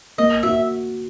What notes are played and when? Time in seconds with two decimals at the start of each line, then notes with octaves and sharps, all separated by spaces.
0.18 A#3 D#5
0.43 F#4 E5